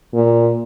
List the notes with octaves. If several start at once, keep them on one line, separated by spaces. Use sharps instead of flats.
A#2